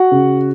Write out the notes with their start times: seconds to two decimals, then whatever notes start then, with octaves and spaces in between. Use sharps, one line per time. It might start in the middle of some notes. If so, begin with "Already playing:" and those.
Already playing: F#4 F#5
0.12 C#3